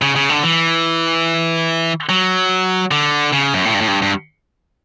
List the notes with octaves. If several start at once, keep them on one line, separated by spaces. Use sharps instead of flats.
C#3
C#3
D3
E3
F#3
D3
C#3
F#2
A2
G2
A2
G2
G2